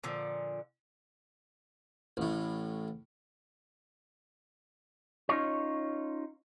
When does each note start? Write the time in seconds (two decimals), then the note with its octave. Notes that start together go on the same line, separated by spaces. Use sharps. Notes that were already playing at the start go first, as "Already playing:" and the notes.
0.04 A#2 D3 F3
2.17 A1 A2
5.29 C#4 D#4 F4 C#5